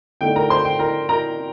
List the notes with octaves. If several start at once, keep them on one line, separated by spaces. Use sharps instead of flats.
D3 A3 D#4 G5
A#4 A#5
C5 C6
G5
A#4 A#5
A#4 A#5